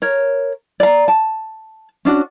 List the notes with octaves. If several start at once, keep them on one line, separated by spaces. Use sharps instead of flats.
A#4 C#5
D5 A#5
A5
C#4 D4 F#4